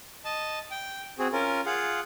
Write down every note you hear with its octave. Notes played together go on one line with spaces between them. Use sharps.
D#5 A5
G5
C4 F#4 G#4
C#4 F4 A#4
F4 G#4 F5 F#5